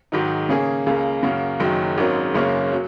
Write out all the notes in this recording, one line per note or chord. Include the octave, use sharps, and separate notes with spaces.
G#2 D#3 F#3 D#4
C#3 A#3 C#4 G#4
C#2 C#3 A#3
F#2 C#3 A#3 F#4 A#4
F#1 F#2 D#3 F#3
G#1 G#2 F#3 C#4 A#4
F#1 F#2 C#3 A#3 C#4
F#3